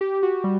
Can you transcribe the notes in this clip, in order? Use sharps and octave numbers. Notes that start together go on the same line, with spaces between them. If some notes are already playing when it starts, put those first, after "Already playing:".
G4
F#4
G3